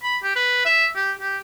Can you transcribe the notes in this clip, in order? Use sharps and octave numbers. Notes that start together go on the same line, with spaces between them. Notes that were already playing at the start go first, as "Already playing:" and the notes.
B5
G4
B4
E5
G4
G4